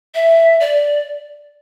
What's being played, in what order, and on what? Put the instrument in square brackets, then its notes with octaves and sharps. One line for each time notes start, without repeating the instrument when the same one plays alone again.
[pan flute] E5
D5